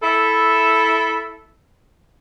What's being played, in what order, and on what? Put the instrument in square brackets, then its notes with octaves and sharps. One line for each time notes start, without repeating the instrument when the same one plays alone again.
[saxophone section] E4 A4 E5